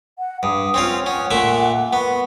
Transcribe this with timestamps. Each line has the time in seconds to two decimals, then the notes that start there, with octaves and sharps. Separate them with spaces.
0.19 F#5
0.43 G2 D#6
0.74 C4 C#4 F4
1.06 C#4 F#5
1.31 A#2 A3 E5
1.93 B3 C#6